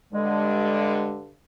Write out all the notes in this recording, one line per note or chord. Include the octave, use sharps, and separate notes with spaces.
G2 D3 G#3